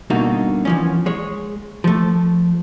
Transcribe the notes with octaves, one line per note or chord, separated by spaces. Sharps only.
G2 B2 D3 A#3 D#4 F#4
E3 F3 C#4
G#3 C#5
F3 A3